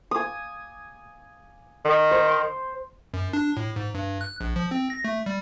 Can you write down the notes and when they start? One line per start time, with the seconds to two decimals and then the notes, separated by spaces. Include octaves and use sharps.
0.11 G#5 D#6
1.85 D#3
2.11 C5
3.14 F#2
3.33 D4
3.57 A2
3.76 G#2
3.95 G2
4.21 F#6
4.41 A#1
4.56 F3
4.71 C4
4.90 A#6
5.05 A3
5.26 G3